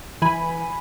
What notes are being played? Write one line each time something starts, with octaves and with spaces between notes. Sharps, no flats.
E3 G#5 B5